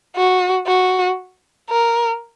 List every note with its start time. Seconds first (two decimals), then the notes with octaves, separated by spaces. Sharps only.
0.16 F#4
0.67 F#4
1.70 A#4